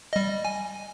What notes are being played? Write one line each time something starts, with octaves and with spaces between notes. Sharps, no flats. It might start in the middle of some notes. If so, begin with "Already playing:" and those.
G3 D#5
G#5